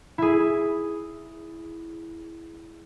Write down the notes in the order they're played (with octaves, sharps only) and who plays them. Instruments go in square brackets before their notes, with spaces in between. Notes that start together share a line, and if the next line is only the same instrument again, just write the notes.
[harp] E4 G#4